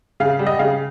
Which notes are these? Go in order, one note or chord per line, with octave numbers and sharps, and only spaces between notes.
C#3 F5
G3
D#5
C#3 F5